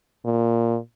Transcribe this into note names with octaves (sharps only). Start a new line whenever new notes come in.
A#2